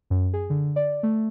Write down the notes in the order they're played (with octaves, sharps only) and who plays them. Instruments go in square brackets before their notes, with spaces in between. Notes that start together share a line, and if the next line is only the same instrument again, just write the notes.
[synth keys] F#2
G#4
D3
D5
A3